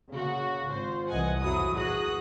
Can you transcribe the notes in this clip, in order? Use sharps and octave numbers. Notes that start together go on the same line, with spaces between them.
C#3 A#3 F#4
G#1 F4 C5
C2 E3 D#5 F#5 G#5
A#1 F2 F#3 E4 F#4 D#6
E2 F#4 G#4 D#6 F#6 A#6